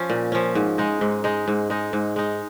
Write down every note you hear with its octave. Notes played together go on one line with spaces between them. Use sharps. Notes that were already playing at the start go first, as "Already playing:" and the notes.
Already playing: F3 C#4
A#2
F3 C#4
G#2
G#3 D#4
G#2
G#3 D#4
G#2
G#3 D#4
G#2
G#3 D#4